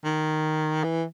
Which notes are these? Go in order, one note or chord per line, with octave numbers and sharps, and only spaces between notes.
D#3
E3